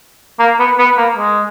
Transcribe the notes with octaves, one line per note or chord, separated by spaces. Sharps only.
A#3
B3
B3
A#3
G#3